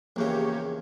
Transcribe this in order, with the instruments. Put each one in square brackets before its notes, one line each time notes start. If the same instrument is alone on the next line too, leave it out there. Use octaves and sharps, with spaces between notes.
[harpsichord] A#1 E2 C#3 [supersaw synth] A#3 G4 C#5